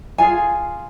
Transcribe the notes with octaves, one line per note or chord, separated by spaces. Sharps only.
F4 G#4 G#5